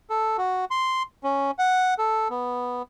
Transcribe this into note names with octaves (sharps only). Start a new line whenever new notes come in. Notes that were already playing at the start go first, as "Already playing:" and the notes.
A4
F#4
C6
C#4
F#5
A4
B3